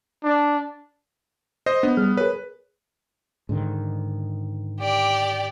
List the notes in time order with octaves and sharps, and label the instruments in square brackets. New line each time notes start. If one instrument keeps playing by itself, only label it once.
[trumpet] D4
[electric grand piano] C5 D#5
[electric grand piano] B3 [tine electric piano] D4
[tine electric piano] G3 G#4 F6
[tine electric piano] G#4 A#4 C#5 [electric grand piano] B4
[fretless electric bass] G#2 D3 D#3
[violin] G4 D5